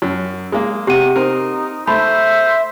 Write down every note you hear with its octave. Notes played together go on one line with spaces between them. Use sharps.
F#2
G#3 A#3
C3 G4 F#5 D#7
C4 D#4 A#4
A3 C5 E5 B5